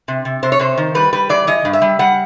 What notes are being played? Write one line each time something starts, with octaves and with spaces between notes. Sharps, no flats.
C3
C3
C3 C5
C#5
C3 C5
D#3
G3 B4
G3 B4
E3 D5
E3 D#5
G2
E5
G3
G3 F#5